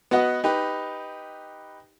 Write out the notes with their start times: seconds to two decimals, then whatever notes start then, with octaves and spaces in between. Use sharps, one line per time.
0.11 B3 F#4 B4 D#5 F#5
0.44 D#4 G4 B4